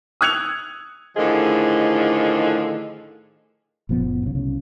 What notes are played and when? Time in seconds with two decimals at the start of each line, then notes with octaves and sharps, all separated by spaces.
0.21 D#6 E6 F#6 G#6 C#7 F7
1.17 A2 D3 D#3 F3 G#4 D#5
3.89 F#1 A#2 F3 B3
4.23 B1 C#3
4.35 C2 C#3